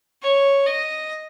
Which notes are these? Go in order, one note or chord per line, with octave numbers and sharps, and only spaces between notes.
C#5
D#5